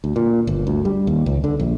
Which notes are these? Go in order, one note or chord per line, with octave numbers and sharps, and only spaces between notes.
D2
A#2
G1
D2
G3
D#2
C#2
D3
A#1